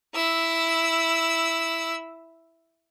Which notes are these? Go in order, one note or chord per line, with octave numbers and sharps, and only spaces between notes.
E4 E6